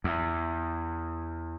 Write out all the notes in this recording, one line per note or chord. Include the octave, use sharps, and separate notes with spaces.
E2